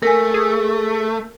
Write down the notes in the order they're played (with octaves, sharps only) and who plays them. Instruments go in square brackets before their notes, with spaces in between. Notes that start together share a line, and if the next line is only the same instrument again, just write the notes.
[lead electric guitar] A3 [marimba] A#4 G#5
[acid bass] G#4